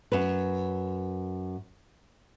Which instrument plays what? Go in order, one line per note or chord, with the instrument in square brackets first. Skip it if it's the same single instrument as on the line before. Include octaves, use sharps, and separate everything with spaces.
[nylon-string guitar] F#2 B4